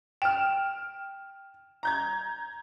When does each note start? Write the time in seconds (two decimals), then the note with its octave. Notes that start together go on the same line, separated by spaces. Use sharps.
0.22 G5 F6 D7 E7
1.83 A#5 G6 G#6